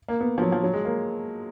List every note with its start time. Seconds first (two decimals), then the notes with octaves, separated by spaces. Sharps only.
0.09 A#3
0.21 B3
0.38 F3
0.42 F#3
0.52 F3
0.63 F#3
0.74 G#3
0.85 A#3